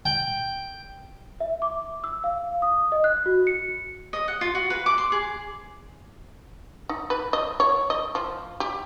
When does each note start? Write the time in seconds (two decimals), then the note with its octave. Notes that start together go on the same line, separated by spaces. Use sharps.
0.05 G5
1.40 E5
1.62 D6
2.04 E6
2.24 F5
2.62 D#6
2.92 D#5
3.04 F#6
3.26 F#4
3.47 C#7
4.13 D#5
4.28 F#5
4.41 F4
4.55 F#4
4.70 B4
4.86 D6
4.98 C6
5.12 G#4
6.89 D#4
7.10 B4
7.33 D#5
7.60 C#5
7.90 D#5
8.15 F3
8.60 G4